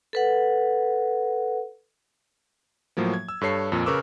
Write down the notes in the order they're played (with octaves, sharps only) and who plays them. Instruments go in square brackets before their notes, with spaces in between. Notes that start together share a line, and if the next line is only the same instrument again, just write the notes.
[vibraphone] A4 B4 F#5
[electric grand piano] A2 F3 F#3 A#3
G#6
E6
G2 A4 C#5 C7
F2 A#2
C#3 A#4 B4 C#6 D6 E6